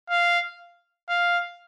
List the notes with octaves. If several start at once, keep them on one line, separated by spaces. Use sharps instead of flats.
F5
F5